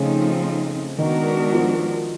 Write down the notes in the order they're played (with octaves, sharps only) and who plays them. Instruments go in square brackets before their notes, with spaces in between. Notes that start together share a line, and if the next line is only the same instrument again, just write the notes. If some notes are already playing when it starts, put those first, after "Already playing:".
Already playing: [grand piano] C#3 [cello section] F3 A3 C4 D#4
[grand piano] D#3 [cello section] G#3 B3 D4 F#4 A#4
[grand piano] F3